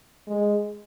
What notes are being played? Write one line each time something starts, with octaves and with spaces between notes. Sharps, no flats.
G#3